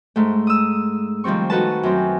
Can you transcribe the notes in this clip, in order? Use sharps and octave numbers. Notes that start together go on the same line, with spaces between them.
G#2 A3
D#6 E6
D#3 F3 G3 C4 C#6
D#4 F#4 A4 B4 A5
F#2 C4